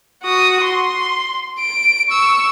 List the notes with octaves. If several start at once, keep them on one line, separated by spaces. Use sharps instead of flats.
F#4 D#6
C6
D7
C#6 E6